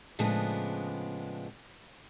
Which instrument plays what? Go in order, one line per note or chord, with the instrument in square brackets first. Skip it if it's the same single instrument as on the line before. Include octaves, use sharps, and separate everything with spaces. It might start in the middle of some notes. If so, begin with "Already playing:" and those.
[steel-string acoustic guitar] A2 C#3 F3 G#3 B3 D4